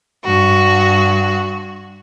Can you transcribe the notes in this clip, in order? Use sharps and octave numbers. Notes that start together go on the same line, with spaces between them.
G2 F#4